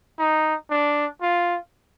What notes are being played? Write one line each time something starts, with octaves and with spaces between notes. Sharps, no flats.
D#4
D4
F4